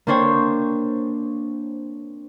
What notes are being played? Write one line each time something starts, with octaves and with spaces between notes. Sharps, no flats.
A#3 C4 D4 C5 C#5 G5